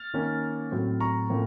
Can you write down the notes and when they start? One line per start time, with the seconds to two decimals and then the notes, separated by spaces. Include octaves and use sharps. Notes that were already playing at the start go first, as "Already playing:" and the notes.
Already playing: F6 A6
0.14 D#3 A#3 C#4
0.71 A2 F#3 C4
1.00 A#5 C#6
1.30 A2 F3 A#3 C#4